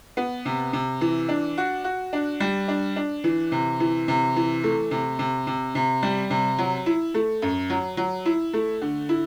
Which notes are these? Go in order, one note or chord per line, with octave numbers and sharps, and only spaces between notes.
B3
C3
C3
E3
D4
F#4
F#4
D4
G3
D4
D4
E3
C3
E3
C3
E3
A3
C3
C3
C3
C3
G3
C3
F#3
E4
A3
F#2
F#3
F#3
E4
A3
D3
E4